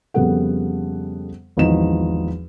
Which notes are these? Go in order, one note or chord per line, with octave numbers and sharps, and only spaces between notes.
F2 C#3 G3 B3 A4 F#5
G#1 E2 F3 D#4 E7